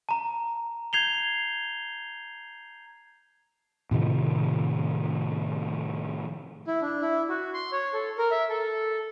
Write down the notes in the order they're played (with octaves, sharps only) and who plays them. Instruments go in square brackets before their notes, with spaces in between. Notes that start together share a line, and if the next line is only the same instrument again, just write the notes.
[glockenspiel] A5 A#5
G6 G#6 C7 F7 G7
[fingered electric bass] A2 C3 D#3 F3
[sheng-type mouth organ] E4
D4
E4
F#4
C6
C#5
A4
A#4
E5
A4